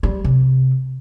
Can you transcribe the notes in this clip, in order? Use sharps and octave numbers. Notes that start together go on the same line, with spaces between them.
G3
C3